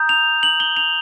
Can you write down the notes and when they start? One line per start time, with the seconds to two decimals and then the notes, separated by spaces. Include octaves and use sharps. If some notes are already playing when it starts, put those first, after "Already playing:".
Already playing: A#5 D#6 G6
0.09 F7
0.43 F#7
0.60 G7
0.77 F7